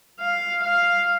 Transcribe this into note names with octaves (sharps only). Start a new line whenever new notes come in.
F5
F5